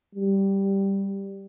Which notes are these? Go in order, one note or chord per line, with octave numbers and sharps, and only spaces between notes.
G3